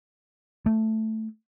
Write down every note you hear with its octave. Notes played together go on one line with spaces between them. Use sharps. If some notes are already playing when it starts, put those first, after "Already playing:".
A3